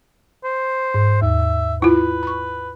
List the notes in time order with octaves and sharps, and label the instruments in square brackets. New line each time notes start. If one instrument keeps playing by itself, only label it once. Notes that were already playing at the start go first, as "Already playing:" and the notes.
[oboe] C5
[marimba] G#2
[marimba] D#2 [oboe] E5
[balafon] E4 F4 [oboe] B4
[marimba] B5 C#6